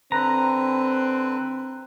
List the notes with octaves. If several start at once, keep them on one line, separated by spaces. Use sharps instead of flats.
D3 C4 B4 A#5